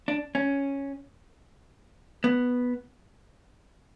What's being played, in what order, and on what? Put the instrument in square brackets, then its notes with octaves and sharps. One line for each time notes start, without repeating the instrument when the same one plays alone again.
[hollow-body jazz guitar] D4
C#4
B3